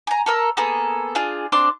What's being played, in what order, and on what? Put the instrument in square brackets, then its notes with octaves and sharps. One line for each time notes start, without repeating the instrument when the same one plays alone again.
[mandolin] G#5 A#5
A4 A#4 E6
A#3 B3 G#4 A4
D4 F4 G#4
C4 D4 C6 D6